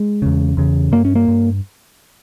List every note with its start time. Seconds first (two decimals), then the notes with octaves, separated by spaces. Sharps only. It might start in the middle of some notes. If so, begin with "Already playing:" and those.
Already playing: G#3
0.22 E2 C#3
0.57 E2 C#3
0.92 G2 A#3
1.05 C#4
1.15 A#3
1.28 G2